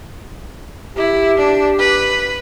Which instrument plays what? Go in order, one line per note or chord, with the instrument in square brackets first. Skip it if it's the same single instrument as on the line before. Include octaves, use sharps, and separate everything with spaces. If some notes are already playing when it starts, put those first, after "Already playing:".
[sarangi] E4 [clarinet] G4
[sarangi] D4
B4